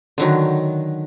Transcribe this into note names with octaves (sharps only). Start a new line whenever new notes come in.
D3 D#3 F#3